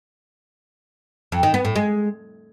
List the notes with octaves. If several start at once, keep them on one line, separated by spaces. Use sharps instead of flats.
F2
D#3
B3
A2
G#3